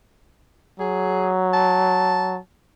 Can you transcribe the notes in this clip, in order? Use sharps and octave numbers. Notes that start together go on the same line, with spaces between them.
F#3 G#4
A5